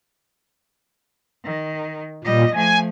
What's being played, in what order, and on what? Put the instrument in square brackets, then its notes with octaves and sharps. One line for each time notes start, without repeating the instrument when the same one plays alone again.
[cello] D#3
[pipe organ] A#2 [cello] G3 D#5
[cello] F3 A3 [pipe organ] G#5